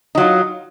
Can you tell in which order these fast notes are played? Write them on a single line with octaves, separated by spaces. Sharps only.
D#4 F#3 F4